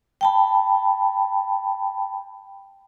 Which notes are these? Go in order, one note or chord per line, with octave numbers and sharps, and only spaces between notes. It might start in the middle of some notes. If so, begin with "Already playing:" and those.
G5 A5 B5